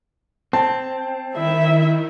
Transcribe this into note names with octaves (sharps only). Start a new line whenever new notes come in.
C4 A5
D#3 E4 E5